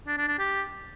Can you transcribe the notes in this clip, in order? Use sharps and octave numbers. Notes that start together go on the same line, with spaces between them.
D4
D4
D4
G4